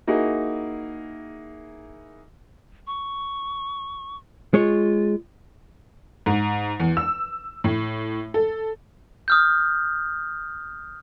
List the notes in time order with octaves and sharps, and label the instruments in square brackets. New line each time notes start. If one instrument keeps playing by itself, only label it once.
[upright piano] A#3 D#4 E4 F#4 G#4
[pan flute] C#6
[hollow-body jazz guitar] G#3 C#5 [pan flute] F4
[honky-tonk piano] G#2
E2
E6
A2
A4
[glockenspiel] D#6 F6 G6